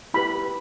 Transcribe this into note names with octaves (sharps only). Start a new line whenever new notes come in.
E4 G4 B4 B5